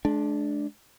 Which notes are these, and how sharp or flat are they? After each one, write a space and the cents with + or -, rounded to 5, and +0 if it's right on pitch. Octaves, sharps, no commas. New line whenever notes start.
G#3 +45 D4 +0